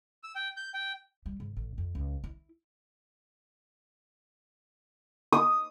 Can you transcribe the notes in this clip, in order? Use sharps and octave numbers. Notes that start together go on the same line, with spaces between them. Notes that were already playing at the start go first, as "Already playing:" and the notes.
E6
G5
G6
G5
G3
G#2
A1
F2
C#2
E4
D#6